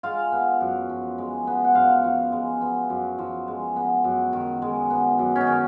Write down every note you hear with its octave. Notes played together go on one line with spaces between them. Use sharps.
G#3 F4 F5
B3
F#2
F3
G#3
B3
F#5
F#2 F4 F5
F3
G#3
B3
F#2
F3
G#3
B3
F#2
D#3
G#3
B3
F#2
C#4
D#4
D#3